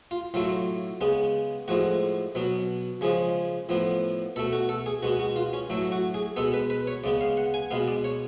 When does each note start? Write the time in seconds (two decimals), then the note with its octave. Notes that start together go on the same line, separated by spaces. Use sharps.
0.11 F4
0.34 A2 F#3 A3 F4
1.01 C#3 G#3 B3
1.68 A2 F3 G#3 F#4
2.35 B2 F#3 B3
3.01 C#3 F3 G#3 G#4
3.69 A2 F3 B3
4.36 B2 A3 A4
4.53 F#4
4.69 A4
4.86 G#4
5.03 B2 G#3 B3 F#4
5.19 F#4
5.36 F4
5.53 C#4
5.70 A2 F#3 A3
5.92 F#4
6.14 G#4
6.36 B2 G#3 B3 A4
6.54 B4
6.70 B4
6.87 C#5
7.04 C#3 G#3 B3 D5
7.21 F5
7.37 F#5
7.54 G#5
7.71 B2 G#3 B3 F5
7.88 D5
8.04 C#5